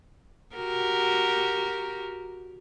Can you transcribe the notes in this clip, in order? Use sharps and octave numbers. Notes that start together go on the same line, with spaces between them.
F#4 G4 A#4